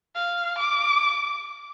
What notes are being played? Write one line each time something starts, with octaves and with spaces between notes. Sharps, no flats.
F5
D6